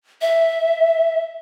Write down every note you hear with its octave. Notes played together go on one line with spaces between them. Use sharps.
E5